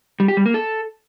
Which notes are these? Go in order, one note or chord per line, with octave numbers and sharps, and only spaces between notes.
G3
G4
G3
A#3
A4